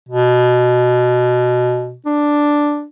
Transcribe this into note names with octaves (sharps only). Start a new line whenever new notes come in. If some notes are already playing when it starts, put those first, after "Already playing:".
B2
D4